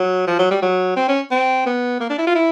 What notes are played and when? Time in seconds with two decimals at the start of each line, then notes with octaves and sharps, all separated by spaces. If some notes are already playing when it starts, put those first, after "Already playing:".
Already playing: F#3
0.27 F3
0.39 F#3
0.51 G3
0.62 F#3
0.97 C4
1.08 C#4
1.31 C4
1.66 B3
2.00 A#3
2.10 D4
2.18 E4
2.27 F4
2.35 E4